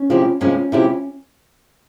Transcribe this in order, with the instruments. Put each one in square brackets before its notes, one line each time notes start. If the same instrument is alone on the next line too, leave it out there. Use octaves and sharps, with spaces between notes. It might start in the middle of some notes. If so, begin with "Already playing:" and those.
Already playing: [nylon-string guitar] C#4
[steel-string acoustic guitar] C3 F3 G#3 E4 G4
[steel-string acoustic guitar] C3 F3 G#3 E4 G4 [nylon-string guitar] C#4
[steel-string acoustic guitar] C3 F3 G#3 E4 G4